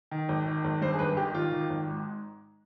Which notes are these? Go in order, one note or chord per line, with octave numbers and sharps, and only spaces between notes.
D#3
G#1
D#3
G#1
G2 C5
G#4
G#1 B4
D#3 G4
G#1 F4
D#3
G#1
G#2